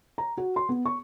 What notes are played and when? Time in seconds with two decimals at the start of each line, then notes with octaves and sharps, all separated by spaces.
0.18 A#5
0.38 F#4
0.56 C6
0.69 B3
0.86 C#6